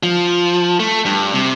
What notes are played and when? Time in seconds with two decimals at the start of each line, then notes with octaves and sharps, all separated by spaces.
0.03 F3
0.80 A3
1.05 G2
1.34 C3